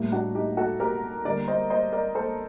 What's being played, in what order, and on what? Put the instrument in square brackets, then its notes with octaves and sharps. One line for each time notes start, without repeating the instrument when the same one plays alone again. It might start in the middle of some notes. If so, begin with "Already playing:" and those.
Already playing: [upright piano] A2 G3 A#3
D4 F#4
D#4 G4
F#4 A4
G4 A#4
D3 G3 A#3 A#4 D5
C5 D#5
C5 D#5
A#4 D5
A4 C5